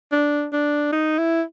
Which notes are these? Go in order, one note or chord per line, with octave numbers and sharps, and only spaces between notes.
D4
D4
D#4
E4